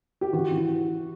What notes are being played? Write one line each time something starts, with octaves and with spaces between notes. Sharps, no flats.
G4
E3 F#4
E3